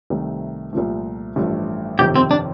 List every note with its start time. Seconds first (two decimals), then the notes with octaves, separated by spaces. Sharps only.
0.10 C2 C3 D#3 A3
0.73 C2 A#2 F3 A3
1.36 A1 G2 F3 A3
1.99 G1 F2 C3 D#3 G4
2.16 C4
2.31 D4